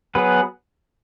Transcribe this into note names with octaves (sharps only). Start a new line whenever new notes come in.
F#3 B3 G#4 B4